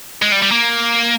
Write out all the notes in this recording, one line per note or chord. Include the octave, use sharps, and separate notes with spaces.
G#3
G3
G3
A#3